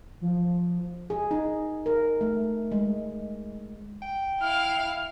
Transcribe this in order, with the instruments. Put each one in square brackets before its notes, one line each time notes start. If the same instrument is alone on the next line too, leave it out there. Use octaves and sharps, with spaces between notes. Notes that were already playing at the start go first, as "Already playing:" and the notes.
[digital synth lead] F3
[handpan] G#4
D#4
A#4
A3
G#3
[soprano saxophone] G5
[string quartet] E4 F5 [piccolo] F6